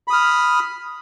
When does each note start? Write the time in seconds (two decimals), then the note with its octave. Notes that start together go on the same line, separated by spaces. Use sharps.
0.08 B5
0.10 D#6
0.13 F6